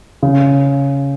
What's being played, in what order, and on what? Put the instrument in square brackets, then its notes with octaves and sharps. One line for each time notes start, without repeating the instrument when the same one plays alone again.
[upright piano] C#3